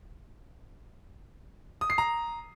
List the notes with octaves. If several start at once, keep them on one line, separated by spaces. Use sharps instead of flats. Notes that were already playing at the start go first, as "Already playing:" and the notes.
D#6
C7
A#5